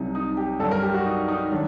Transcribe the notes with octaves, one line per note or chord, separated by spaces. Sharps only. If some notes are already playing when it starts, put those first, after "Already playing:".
Already playing: C2 C3 F#3 D#4
D#4
G4
G2 F#3 A4
A#4
G4
F#4
D#4
D#4
D#3 F#3 D4